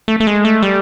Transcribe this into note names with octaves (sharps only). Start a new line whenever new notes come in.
A3
A3
G#3
A3
G3